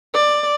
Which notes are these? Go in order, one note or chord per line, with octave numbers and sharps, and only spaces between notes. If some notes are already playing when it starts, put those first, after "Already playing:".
D5